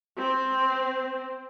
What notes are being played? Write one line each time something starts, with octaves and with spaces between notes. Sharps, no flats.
C4